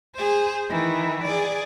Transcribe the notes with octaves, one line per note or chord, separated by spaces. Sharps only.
G#4 C5
D#3 E3
G#4 D5